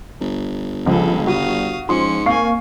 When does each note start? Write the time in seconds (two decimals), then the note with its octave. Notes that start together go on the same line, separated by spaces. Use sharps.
0.21 G1
0.86 C#2 F3 G#4 A4
1.27 G3 F#4 F5 D#6
1.89 G#2 F3 C#4 C6 C#7
2.26 A#3 C4 F5 G#5 C#6 C7